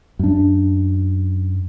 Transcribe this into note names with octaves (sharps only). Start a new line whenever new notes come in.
F#2 D4